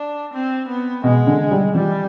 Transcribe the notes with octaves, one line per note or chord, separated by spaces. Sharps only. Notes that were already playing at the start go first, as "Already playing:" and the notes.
Already playing: D4
C4
B3
B2 G#3
D3
G3
F3 G3